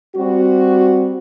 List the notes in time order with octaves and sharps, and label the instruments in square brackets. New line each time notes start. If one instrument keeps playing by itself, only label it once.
[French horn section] G3 C4 F#4